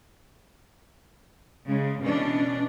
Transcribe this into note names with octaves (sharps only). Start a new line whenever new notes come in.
C#3 G#3
B2 E3 C#4 D4